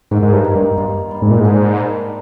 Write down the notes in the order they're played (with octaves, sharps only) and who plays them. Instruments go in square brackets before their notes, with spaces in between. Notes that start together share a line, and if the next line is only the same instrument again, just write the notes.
[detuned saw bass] G#2 [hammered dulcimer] D#3
[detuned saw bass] G#2
G2
[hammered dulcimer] A#3
[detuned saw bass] G2
[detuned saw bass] G2 [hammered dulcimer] F4
[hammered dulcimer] G3
[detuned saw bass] G#2
A#2
[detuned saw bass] G#2 [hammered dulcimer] D4
[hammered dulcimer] A#3